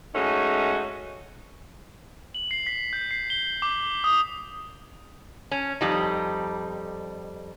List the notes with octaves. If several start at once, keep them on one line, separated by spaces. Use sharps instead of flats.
G#3 A3 C#4 D#4 F#4
F#7
C7
B6
G6
C7
G7
D6
D#6
C#4
F2 G3 D#4